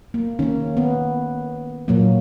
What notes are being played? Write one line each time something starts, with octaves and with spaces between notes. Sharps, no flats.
A#3
D#3 A#3 C#4
B3
A#2 F#3 A#3